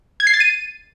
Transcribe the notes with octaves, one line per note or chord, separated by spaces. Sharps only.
G#6
C7
A6
D#7